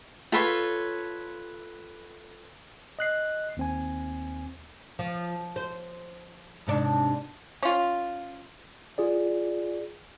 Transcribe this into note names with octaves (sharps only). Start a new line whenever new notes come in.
F4 A4 B4 C#5
D#5 F#6 C7
D#2 C4 G#5
F3
C5
G#2 C3 D4
C#4 F4
F4 G#4 D5